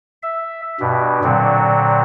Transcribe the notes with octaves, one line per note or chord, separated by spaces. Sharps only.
E5
G2 B2
A#2 D3 F#3 C4